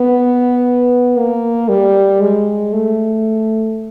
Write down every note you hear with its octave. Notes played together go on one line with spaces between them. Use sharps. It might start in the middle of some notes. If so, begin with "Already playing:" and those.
Already playing: B3
A#3
G3
G#3
A3